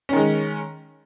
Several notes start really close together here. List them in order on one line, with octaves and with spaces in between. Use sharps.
C#4 D#3 G#3